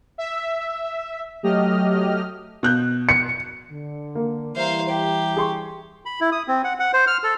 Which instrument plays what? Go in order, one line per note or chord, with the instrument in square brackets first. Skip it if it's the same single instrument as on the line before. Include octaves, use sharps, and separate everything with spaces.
[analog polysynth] E5
F#3 A3 G4 D#5 F6
[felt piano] B2 F#6 G6
[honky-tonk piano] C#7
[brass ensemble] D3
[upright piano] A#3
[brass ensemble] E3 G3 [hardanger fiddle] C5 F5 [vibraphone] E5 A#5
[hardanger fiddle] G4
[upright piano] G#4 C6 C#6
[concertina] B5
E4
D#6
C4
F#5
F#5
C5
F6
A4